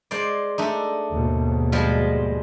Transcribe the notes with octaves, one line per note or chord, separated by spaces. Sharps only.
G#3 C5 D5
A3 D4 D#4
D#2 G#2 B2
F3 G3 G#3